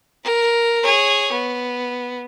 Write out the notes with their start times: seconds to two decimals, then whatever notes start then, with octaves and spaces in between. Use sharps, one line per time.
0.24 A#4
0.83 G#4 C#5
1.32 B3